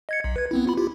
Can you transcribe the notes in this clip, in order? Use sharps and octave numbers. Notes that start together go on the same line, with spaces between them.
D#5 G#6 C#7
B1
B4 G#6
B3 C4 E4
B3 F4 B5
E4 F4 G4